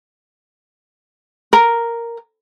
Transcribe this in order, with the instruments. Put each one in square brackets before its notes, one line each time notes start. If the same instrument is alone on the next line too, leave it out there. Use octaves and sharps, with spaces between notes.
[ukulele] A#4